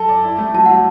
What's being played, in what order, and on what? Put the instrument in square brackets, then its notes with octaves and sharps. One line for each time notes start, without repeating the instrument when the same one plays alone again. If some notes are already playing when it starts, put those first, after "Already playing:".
Already playing: [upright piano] F#3 A4 [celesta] A5
[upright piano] D5
E4
A3
[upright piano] F#3 [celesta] A5
[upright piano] F#3 [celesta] F#5